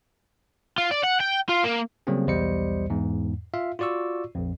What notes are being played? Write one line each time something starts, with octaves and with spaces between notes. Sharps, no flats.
F4
D5
F#5
G5
F4
A#3
C#3 F#3 G3 A#3 C4 C#4
B1 E2 G3 C5 D#5 C#7
E2 G#2
F4 E5 F5
F4 F#4 D5 C#6 E6
A#1 F2